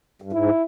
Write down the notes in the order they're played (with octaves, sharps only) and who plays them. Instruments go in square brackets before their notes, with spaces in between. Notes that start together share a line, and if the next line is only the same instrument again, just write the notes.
[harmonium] G2
[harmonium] G#2 [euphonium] E4